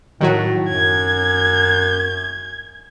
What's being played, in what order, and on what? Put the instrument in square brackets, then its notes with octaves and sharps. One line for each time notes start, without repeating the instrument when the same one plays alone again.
[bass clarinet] A2 [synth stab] D#3 F#3 F#4
[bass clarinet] F#2 [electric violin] G#6